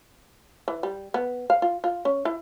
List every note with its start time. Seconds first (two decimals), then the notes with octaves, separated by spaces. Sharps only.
0.68 E3
0.83 G3
1.14 B3
1.50 F5
1.62 F4
1.84 F4
2.05 C#4
2.25 E4